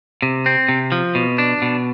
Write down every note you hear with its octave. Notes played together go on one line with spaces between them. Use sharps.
C3
C4
C3
F3
B2
D4
B2